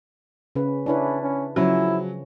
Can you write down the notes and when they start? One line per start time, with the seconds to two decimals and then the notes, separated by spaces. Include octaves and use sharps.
0.55 C#3 C#4 B4
0.86 C#4 D4 E4 B4
1.23 C#4
1.56 C#3 F3 F#3 C#4 E4